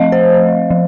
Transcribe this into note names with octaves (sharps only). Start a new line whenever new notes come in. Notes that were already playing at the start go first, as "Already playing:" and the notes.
Already playing: F3 A3 C4 D#5 F5
C5
F3